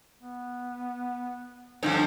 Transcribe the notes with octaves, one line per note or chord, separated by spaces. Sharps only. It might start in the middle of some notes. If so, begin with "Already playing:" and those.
B3
G2 D3 F3 C4 C#4 D#4